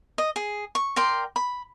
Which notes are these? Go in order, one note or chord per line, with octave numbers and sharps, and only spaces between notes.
D#5
G#4
C#6
A#4 D5 G5 C6
B5